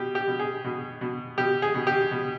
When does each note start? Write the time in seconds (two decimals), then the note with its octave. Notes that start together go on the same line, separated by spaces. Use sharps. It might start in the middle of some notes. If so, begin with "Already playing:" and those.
Already playing: B2 G4
0.15 G4
0.27 B2
0.39 G#4
0.64 B2
1.01 B2
1.38 B2 G4
1.62 G#4
1.74 B2
1.87 G4
2.11 B2